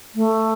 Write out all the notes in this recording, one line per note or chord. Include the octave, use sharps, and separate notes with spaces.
A3